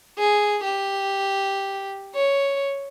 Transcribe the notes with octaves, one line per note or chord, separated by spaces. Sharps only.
G#4
G4
C#5